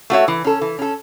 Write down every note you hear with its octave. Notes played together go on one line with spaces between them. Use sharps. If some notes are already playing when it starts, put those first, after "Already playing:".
A3 F#4 C#5 E5
E3
C#4 A4
E3
C#4 A4